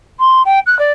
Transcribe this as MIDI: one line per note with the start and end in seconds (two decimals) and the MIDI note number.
0.19 0.42 84
0.45 0.59 79
0.66 0.77 90
0.79 0.92 74